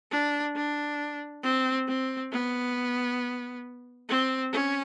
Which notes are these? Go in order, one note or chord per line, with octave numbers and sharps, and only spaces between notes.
D4
D4
C4
C4
B3
C4
C#4